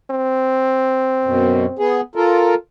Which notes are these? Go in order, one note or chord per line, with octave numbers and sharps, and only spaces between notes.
C4
F#2 B2
B3 G#4
F4 A4 A#4